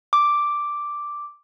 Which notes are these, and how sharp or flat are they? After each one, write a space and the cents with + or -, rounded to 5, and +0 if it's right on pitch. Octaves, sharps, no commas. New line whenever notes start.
D6 +0